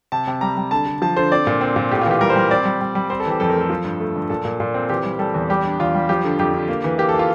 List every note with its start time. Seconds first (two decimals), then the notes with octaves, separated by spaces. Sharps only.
0.12 C3 A5
0.27 C3
0.41 G3 A#5
0.57 G3
0.71 D3 A5
0.86 D3
1.02 F3 A5
1.17 D3 C5
1.32 C4 D5
1.47 A#2
1.61 C4
1.76 A#2
1.91 A2 G4
2.01 F4
2.06 E3 G4
2.21 G3 A#4
2.30 C5
2.36 G3 A#4
2.51 C4 D5
2.65 G3
2.81 G3
2.95 G3
3.10 C4 C5
3.20 A4
3.26 E3 G4
3.40 F2 A4
3.50 A#4
3.55 A3
3.61 A4
3.70 F3
3.85 G2
4.00 A3
4.16 G2
4.30 A#2 A4
4.45 A#2
4.60 A#2
4.74 C4
4.90 E3 G4
5.05 G3
5.19 G3 A4
5.34 E2
5.50 G3 G4
5.64 D4
5.79 E2 F4
5.94 G3
6.09 F3 G4
6.24 D3
6.39 F2 G4
6.54 D3
6.69 A#3
6.84 E3
6.98 A#3 G4
7.09 A4
7.14 A#3 F4